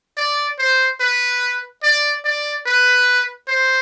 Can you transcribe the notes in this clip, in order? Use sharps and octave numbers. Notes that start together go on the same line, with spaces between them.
D5
C5
B4
D5
D5
B4
C5